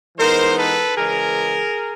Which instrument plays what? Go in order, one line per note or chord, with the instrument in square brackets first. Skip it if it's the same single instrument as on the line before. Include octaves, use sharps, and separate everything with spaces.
[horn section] E3 G#3 B3 D#4 A#4 C5
A4 B4
C#3 E3 G#3 G#4 A#4